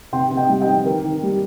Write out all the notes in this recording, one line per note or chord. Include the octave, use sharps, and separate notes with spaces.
C3 G5 C6
C3
D#5 G5
G3
D#5 G5
C4
D#3 A#4
D#3
G3